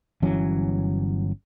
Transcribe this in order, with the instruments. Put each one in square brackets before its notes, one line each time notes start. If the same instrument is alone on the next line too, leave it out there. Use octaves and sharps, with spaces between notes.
[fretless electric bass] G1 E3 F#3 C#4